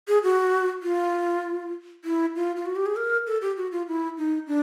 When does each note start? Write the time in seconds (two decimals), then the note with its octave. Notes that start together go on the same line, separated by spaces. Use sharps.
0.08 G#4
0.23 F#4
0.83 F4
2.05 E4
2.36 F4
2.56 F4
2.66 F#4
2.76 G4
2.86 G#4
2.96 A#4
3.27 A4
3.42 G4
3.57 F#4
3.72 F4
3.88 E4
4.18 D#4
4.47 D4